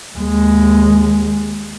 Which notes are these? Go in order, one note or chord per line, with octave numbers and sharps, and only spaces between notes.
D#2 G#3